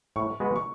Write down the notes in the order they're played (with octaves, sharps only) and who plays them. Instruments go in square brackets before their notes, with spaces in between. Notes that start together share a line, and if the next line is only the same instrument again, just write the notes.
[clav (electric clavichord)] A2 [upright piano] C#6
[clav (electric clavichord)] G#3 B3 F#4 B4
[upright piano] C#6